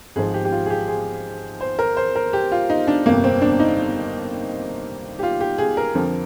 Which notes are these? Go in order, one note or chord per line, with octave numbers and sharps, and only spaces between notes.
G#1 G#2 F3 G#4
G4
G4
F4
G#4
G4
G#4
C5
A#4
C5
A#4
G4
F4
D#4
D4
G1 F2 C3 A#3
C4
D4
D#4
G4
F4
G4
G#4
A#4
F2 D3 F3